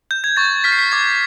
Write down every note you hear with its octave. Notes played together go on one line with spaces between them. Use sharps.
G6
G#6
C#6 A6
F6 B6
C7
B6
D6 G#6